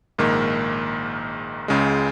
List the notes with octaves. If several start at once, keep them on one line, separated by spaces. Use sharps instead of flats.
A#1 G#2 D#3 A#3
C#2 C#3 G#3